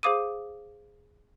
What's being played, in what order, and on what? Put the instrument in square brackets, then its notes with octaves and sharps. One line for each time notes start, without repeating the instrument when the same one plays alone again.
[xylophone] G#4 C5 F5 D6 D#6 D#7